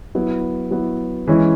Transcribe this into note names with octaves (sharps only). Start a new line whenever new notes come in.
F#3 B3 E4
F#3 B3 E4
E3 G#3 C#4 E4